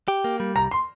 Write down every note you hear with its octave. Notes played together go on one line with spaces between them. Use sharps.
G4
A#3
G3
C2 A#5
C6